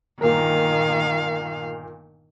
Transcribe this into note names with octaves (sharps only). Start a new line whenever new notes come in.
G1 A#2 D#3 A#4 F5